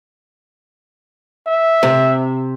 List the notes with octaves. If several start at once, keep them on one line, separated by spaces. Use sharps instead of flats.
E5
C3